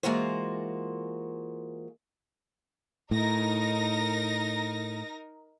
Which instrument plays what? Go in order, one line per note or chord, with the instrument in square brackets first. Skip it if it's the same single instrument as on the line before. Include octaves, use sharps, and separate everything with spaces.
[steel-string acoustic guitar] E3 G#3 A#3 F4 F#4 C5
[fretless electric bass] A2 [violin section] D#4 A#4 A#6